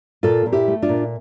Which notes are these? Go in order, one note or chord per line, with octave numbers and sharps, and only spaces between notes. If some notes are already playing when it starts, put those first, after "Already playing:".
A#2 F4 A4
A#2
E4 G4
A3
D4 F4
A#2